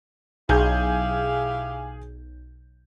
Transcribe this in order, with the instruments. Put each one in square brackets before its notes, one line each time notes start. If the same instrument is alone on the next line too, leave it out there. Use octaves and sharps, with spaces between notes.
[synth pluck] B1 [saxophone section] E4 G4 F5 [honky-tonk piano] G#4 G6